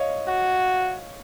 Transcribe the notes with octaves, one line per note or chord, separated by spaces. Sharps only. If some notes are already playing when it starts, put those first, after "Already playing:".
Already playing: C#5 D#5 F5
F#4